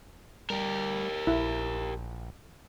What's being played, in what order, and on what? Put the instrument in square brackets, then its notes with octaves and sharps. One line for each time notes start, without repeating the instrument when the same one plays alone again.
[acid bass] G3 [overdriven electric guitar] G4 A#4
[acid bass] A#1 [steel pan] E4